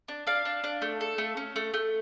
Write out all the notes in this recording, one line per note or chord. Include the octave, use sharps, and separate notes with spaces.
D4
D4 F5
D4
D4
A3
A4
A3
C#4
A3
A3